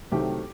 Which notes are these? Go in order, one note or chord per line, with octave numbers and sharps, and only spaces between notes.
C2 C3 D#3 F#3 A3 G4